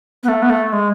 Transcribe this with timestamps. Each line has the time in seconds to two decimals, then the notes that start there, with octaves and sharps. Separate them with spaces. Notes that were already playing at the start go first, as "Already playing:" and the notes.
0.23 B3
0.28 A3
0.42 B3
0.50 A3
0.72 G#3